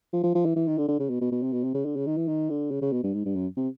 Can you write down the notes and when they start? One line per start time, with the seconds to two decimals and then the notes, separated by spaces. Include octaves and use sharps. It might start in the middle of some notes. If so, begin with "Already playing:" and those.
0.13 F3
0.23 F3
0.35 F3
0.45 E3
0.56 E3
0.68 D#3
0.78 D3
0.88 D3
0.99 C#3
1.10 B2
1.21 B2
1.32 B2
1.42 C3
1.53 B2
1.64 C3
1.74 C#3
1.85 D3
1.96 C#3
2.07 D#3
2.17 E3
2.28 D#3
2.50 D3
2.71 C#3
2.82 C#3
2.92 B2
3.03 G2
3.14 G#2
3.25 G2
3.36 F#2
3.57 C3